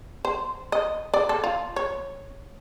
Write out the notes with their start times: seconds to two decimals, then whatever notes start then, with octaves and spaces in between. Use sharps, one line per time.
0.25 C5
0.72 D#5
1.14 D5
1.29 A4
1.44 F4
1.76 C#5